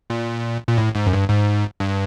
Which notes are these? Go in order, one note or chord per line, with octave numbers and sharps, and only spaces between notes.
A#2
A#2
A2
G#2
F#2
G2
G#2
G2